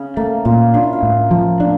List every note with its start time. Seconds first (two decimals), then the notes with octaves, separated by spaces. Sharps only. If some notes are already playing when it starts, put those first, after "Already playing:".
Already playing: C#3
0.17 A3 A#3
0.45 A#2 F4
0.74 D4 F4
0.83 E4
0.93 F4
1.03 A2
1.31 F3
1.60 A#3 D4